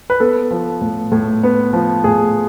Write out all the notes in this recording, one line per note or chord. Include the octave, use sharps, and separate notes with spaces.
B4
B3 A4
F3
A2
A2
B3
F3
A2 G#4